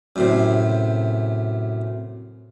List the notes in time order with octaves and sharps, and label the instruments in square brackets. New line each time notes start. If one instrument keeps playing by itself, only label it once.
[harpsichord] F#2 A2 C3